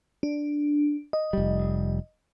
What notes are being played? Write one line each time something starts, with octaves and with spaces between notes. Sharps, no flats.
D4
D#5
F1 G3